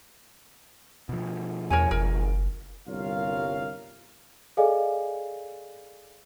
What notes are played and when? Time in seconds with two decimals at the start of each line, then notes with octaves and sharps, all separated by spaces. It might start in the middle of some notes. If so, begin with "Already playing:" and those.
1.09 B2 F3
1.70 E2 A#4 C#5 G#5
1.91 F#1 A#4
2.88 G1 C2 F4 A#4 C#5 F5
4.57 G#4 A4 D5 D#5 F5 G#5